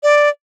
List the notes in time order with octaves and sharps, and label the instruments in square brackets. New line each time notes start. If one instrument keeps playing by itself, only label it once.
[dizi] D5